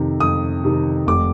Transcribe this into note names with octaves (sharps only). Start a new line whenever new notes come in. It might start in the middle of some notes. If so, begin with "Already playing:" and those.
Already playing: F2 C3 D#3
F2 D#6
C3 D#3
F1 D6